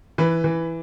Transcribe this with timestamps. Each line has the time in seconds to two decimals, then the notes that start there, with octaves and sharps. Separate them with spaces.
0.18 E3 B4
0.44 E3